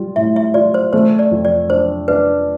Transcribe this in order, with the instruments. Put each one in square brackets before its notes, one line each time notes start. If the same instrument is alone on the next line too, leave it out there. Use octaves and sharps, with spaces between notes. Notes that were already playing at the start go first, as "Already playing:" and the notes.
Already playing: [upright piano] G3 F4
[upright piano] A2 [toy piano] E5
[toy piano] E5
[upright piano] F4 [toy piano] D5
[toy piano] C5
[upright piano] A3 [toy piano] C5
[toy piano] D5
[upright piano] F2
[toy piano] D5
[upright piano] D4 [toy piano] C5
[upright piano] D4 [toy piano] B4